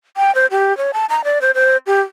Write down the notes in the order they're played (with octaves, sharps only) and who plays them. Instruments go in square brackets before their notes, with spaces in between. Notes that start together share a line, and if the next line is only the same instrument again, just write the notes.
[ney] G5
C5
G4
C#5
A5
A#5
D5
C5
C5
G4